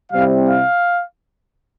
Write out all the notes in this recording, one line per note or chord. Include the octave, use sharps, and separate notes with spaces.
C3 G3 C4 E4 F5
F5